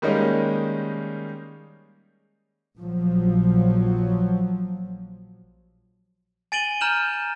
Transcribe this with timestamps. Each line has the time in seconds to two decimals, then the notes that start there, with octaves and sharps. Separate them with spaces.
0.02 D#3 G3 G#3 A#3 C#4 D#4
2.77 A#1 F3 F#3
6.52 G#5 A6 D7 D#7 F#7 G7
6.81 A#5 F6 G6 E7 F#7